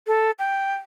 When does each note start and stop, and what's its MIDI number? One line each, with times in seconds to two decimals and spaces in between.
0.07 0.31 69
0.39 0.75 79